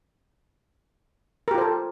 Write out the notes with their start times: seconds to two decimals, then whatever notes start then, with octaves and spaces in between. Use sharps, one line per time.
1.48 A#4
1.51 G4
1.55 F4
1.58 C5
1.61 A4